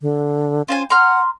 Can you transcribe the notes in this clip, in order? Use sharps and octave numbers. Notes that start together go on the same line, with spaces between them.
D3
C#4 F4 C5 G#5
F#5 A#5 C6 F6